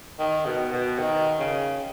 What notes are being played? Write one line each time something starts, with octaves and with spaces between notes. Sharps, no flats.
D#3
B2
B2
D#3
C#3